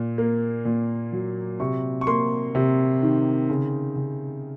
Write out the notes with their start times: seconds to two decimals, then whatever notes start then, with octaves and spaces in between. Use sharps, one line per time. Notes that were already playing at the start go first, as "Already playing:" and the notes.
Already playing: A#2
0.18 A#3
0.65 A#2
1.12 F#3
1.60 C3 C#6
2.01 C#6
2.07 A#3 C6
2.55 C3
3.02 D#3
3.50 C#3
3.96 C#3